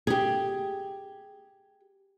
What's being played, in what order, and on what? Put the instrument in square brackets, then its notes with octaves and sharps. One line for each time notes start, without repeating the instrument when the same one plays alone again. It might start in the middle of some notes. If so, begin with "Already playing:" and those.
[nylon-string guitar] G4 G#4